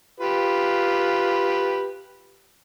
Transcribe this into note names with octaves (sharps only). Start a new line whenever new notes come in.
F4 G4 B4